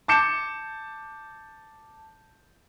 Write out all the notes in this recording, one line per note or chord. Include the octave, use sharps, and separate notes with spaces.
A5 D6 G6 C#7 E7